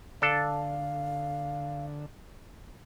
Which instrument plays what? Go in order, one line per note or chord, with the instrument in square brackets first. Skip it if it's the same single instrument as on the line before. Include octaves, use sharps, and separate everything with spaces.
[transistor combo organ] D3 [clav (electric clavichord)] D4 A4 [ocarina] F5